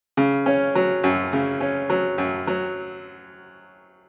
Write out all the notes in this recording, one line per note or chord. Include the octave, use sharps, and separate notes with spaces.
C#3
C#4
F#3
F#2
C#3
C#4
F#3
F#2
F#3